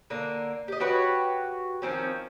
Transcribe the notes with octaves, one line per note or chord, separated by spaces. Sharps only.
D3 A#3
G4 D#5
F#4 G4 B4 C#5
D#3 F3 C4 C#4